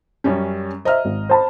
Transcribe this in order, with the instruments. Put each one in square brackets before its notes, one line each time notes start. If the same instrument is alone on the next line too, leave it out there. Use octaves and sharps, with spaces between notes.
[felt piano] F#2 G3 C#4
[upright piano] C5 E5 [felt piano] D#5 A#5 F6
[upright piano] G#1
C5 A5 B5